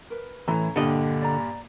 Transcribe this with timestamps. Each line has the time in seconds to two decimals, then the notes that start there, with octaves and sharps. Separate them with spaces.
0.10 A#4 B4
0.48 A2 E3 C#4 A4 A#5
0.76 G2 A#2 D3 D#5 G5
1.22 D5 A#5